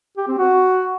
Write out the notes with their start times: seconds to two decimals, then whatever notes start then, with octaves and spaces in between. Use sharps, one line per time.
0.17 G4
0.28 C4
0.38 F#4